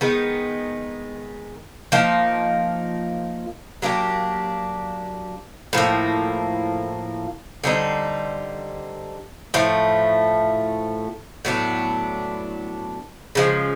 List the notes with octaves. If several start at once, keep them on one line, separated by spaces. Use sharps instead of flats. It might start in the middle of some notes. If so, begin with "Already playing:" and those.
D#3 G#3 B3 D#4
F3 A#3 D#4
F#3 A#3 D4 G4
A2 F3 A#3
D3 G3 C4 D#4
A2 F3 A3
A2 F#3 B3 D4
C#3 F3 G#3